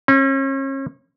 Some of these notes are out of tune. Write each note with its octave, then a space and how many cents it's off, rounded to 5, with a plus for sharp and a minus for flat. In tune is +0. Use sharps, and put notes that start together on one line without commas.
C#4 -40